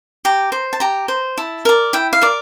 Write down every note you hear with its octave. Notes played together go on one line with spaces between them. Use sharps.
G4 A#5
C5
A5
G4 A#5
C5
E4 A5
A#4 D5
E4 G5
F5
A#4 D5